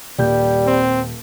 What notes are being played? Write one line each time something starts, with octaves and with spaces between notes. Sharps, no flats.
D#1 G3 G6
C4